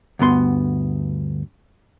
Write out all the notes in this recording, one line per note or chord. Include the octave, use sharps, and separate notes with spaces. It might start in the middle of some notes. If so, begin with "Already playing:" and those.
D2 G2 B3 C6